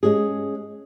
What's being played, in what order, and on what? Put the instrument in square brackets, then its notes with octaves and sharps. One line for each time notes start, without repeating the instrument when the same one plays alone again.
[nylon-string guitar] G#3 C#4 G#4